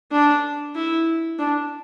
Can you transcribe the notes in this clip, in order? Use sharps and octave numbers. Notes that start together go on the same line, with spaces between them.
D4
E4
D4